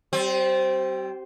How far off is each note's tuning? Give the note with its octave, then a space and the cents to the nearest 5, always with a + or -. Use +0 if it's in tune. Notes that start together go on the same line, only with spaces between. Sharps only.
G3 -35 C4 +0